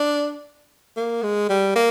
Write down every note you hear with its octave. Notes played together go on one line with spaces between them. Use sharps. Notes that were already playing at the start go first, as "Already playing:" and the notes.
Already playing: D4
A#3
G#3
G3
A#3